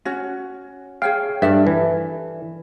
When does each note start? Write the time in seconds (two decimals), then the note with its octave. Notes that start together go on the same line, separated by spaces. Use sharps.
0.05 C#4 F#4
1.02 G#4 C#5 F5 G5
1.42 G2 A4 D5 E5
1.67 E3